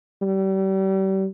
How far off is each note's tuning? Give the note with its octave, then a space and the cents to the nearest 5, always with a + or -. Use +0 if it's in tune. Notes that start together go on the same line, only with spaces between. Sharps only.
G3 -35